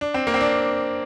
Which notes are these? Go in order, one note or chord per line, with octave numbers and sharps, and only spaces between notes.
D4
C4
A#3
C4
D4